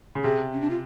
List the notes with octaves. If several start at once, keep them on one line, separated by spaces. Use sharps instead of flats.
C#3
C3 G#4
C#4
D4
F4